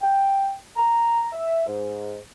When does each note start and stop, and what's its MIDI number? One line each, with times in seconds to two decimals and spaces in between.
0.01 0.55 79
0.77 1.27 82
1.33 1.63 76
1.66 2.17 44